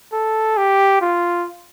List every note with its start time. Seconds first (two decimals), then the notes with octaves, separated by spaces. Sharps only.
0.13 A4
0.57 G4
1.01 F4